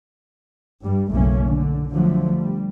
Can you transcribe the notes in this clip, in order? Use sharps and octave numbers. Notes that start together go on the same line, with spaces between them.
G2 G3
F#1 B1 C#3 A3 A#3 C#4
D3
D3 F3 F#3 A3
G3